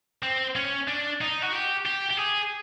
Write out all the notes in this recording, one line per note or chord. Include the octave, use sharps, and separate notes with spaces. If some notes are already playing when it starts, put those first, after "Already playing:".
C4
C#4
D4
D#4
F#4
G4
G4
G4
G#4